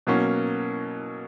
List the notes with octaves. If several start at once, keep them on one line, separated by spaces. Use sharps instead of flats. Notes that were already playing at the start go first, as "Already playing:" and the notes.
B2 F#3 A#3 C#4